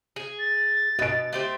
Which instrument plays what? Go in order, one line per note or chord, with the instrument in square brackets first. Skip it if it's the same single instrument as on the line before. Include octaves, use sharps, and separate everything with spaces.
[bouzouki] G#4
[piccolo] A6
[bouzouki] B2 [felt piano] D#5 D7
[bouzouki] A3 G4 C5